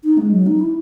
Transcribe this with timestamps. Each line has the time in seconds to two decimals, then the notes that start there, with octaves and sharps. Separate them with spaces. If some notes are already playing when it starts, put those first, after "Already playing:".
0.04 D#4
0.17 G#3
0.31 F#3
0.46 D#4
0.60 E4